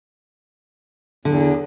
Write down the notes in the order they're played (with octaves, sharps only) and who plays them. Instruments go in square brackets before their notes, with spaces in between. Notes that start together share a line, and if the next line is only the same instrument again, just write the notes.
[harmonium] E2 [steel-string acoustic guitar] D3